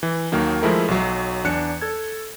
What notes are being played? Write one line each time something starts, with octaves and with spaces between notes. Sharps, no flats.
E3
D#2 D#3 F#3 A#3 D#4
F3 G#3 A3 E4 A#4
B1 F#3
E2 D4 F#6 C#7
A4 G#6